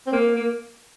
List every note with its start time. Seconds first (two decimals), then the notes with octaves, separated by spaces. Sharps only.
0.07 C4
0.13 A#3
0.36 A#3